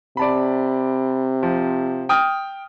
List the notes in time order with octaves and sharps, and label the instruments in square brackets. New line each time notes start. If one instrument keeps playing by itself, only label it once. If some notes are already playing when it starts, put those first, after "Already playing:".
[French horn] C3 [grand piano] D5 A5 B5
[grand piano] F3
G5 D#6 F6